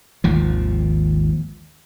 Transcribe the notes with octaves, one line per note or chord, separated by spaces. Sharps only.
G#1 D#2 F3